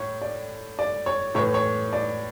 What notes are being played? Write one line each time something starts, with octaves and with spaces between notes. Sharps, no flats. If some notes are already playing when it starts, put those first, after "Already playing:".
Already playing: A2 C#5
D5
D5
C#5
A2 E3 C#5
C#5
D5